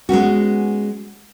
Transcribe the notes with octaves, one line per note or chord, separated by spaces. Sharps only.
G#3 B3 C#4 F#4